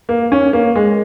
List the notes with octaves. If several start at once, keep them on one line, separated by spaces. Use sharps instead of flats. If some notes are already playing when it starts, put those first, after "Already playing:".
A#3
C#4
A#3
G#3